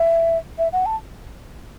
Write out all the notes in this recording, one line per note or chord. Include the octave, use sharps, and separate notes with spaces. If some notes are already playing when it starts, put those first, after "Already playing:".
Already playing: E5
E5
F#5
A5